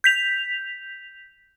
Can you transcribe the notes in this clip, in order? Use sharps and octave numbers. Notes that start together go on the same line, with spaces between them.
G6 B6 F7